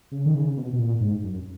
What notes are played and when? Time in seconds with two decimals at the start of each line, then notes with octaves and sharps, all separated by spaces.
0.12 C#3
0.26 D#3
0.35 C#3
0.57 B2
0.73 B2
0.79 A#2
1.01 G#2
1.24 F#2